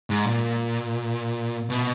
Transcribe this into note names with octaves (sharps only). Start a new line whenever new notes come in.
G#2
A#2
B2